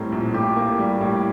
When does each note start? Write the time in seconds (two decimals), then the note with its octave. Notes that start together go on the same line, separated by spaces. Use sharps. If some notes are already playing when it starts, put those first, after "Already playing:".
Already playing: A2 G3 C4 A#4
0.12 A#1
0.34 A2 G4
0.56 A#3
0.79 G3
1.01 A2